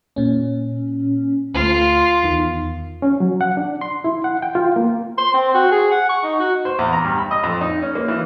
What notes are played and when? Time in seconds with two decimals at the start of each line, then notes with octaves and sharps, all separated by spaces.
0.16 A#2 C#4
1.54 D2 A3 F4
2.23 E2 D#3
3.02 C#4
3.20 F#3
3.41 F#5
3.57 D4
3.81 C6
4.04 E4
4.24 F#5
4.42 G5
4.55 F4
4.76 A#3
5.18 C6
5.34 C4
5.54 F#4
5.72 G#4
5.91 F#5
6.09 C#6
6.24 D#4
6.40 F#4
6.65 C5
6.79 E2
6.93 A#5
7.04 G2
7.18 B5
7.31 D#5
7.43 F2
7.61 D#4
7.82 C#4
7.95 A#3
8.08 E3